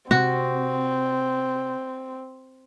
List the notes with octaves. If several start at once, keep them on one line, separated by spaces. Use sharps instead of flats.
C3 C4 F#4